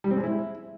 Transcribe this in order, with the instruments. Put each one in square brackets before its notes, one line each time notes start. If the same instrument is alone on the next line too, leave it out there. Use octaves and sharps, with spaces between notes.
[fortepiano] G3
C4
G#3
E4